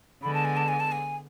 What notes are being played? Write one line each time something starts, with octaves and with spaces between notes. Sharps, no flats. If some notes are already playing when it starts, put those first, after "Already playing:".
D3 G#3 B3 B5
A5
G#5
A5
G#5
A5
G#5